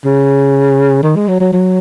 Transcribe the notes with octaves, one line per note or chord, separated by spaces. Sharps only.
C#3
D#3
G#3
F#3
F#3
F#3